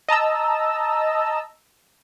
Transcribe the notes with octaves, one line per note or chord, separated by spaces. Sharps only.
D#5 A5 A#5 E6